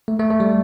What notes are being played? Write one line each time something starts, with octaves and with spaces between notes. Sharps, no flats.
A3
A3
A3
G3